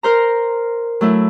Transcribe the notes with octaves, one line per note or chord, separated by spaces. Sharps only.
A#4 C5 A#5
F#3 A3 E4